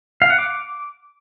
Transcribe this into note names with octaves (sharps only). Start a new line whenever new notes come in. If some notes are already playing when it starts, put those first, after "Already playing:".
F5
F#5
D6